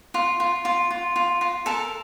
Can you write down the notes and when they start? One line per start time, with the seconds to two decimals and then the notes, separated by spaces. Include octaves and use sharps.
0.14 F4
0.40 F4
0.65 F4
0.91 F4
1.16 F4
1.41 F4
1.66 A4 A#4 A5